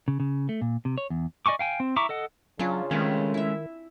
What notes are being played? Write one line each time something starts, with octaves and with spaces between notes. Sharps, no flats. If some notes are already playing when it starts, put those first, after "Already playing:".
C#3
C#3
A3
A#2
C3
C#5
E2
D5 D#5 G#5 C#6 D6
F5 G5 G#5
C4
E4 E5 A#5 C#6 D6
A4 D#5 F#5
C#3 F#3 C#4 D4 F4
D#3 G#3 A3 C4 C#4
E4 E5